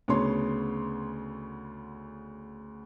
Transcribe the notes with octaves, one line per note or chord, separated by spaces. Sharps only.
D2 C#3 B3 C#5 C6